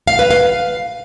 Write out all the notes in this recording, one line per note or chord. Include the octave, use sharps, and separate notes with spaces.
F5
B4
F5